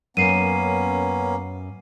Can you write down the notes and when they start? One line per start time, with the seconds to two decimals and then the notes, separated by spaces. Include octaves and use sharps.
0.17 F#2 A#3 B3 C#4 C7 D#7